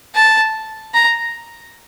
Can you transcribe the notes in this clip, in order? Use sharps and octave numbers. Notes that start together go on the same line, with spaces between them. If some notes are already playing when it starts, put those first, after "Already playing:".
A5
A#5